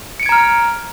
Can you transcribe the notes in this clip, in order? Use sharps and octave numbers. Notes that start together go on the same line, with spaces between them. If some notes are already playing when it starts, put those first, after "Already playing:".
A#5 F6 G#6 C#7 D7